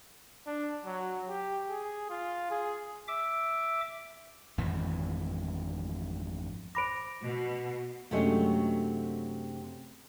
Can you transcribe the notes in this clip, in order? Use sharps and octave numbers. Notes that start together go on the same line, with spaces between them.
D4
F#3
G4
G#4
F4
G#4
E5 D6
G#1 F2 A2 E3
C5 B5 D6 A#6 D7
B2
F#2 C3 F#3 G#3 A3 D4